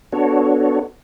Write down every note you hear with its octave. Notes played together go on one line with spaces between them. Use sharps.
B3 D4 F#4 A4 C#5